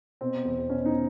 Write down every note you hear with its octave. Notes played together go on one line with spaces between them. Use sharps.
B2 C4
E2
B2 C#4
D#4